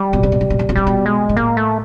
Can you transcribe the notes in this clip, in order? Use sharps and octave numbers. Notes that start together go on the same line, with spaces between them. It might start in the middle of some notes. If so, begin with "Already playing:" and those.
Already playing: G3
B2
C3
B2
C3
B2
C3
B2
C3 G3
B2
G#3
G#2
A2 A#3
A3